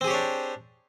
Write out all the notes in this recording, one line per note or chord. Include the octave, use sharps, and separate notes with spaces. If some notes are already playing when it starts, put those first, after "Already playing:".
C4 D4 G4 G#4 C#5